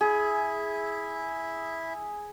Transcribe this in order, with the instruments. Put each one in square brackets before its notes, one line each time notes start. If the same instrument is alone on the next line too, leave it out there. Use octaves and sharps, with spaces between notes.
[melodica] E4 E5 [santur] G#4